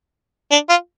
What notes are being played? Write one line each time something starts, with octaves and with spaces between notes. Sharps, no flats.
D4
F4